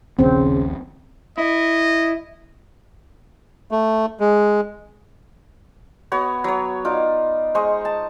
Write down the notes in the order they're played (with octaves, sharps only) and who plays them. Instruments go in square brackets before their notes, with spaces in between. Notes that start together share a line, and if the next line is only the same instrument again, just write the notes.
[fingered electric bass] D#1 A#1 D#2 [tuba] C#3 [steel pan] C4
[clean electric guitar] E4 [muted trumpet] D#5
[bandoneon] A3
G#3
[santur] B3 F#4 C#5
F#3 C#5
D#4 F4 D5
G#3 C5 D#5 C#6
A5